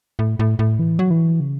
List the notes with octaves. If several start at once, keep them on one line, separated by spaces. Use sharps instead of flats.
A2
A2
A2
E3
F#3
E3
C#3